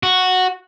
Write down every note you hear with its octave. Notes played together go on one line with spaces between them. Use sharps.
F#4